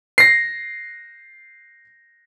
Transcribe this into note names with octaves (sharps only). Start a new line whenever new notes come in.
A#6 C7